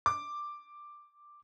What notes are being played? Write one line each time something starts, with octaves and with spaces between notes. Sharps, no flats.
D6